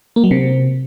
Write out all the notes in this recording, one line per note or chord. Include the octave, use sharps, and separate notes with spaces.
A#3
F#3
C3